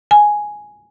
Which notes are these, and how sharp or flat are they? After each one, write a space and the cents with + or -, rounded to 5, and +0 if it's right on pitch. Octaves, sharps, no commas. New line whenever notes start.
G#5 +5